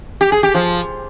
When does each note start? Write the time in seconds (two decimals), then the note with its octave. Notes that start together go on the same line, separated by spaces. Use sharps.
0.21 G4
0.32 G#4
0.43 G4
0.54 F3